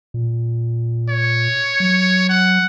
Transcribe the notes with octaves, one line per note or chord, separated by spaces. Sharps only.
A#2
C#5
F#3
F#5